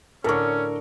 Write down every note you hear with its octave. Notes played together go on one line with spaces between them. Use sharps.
A2 D3 C#4 A4 A#4 C#6